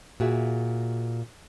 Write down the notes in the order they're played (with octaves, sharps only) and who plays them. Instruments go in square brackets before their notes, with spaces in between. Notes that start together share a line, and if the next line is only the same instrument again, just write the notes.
[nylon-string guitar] A#2 F#4 G#4 E5